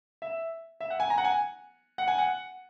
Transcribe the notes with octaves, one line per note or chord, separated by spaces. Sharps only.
E5
E5
F#5
G#5
A#5
F#5
G#5
F#5
G#5
F#5